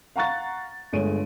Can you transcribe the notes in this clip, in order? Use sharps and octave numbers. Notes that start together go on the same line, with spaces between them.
F5 F#5 A#5 C#6 F#6 A6
G1 G#3 A3 C#5 D7 D#7